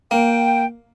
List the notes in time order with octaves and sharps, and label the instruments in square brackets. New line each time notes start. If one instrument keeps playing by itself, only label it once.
[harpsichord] A#3 [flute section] G5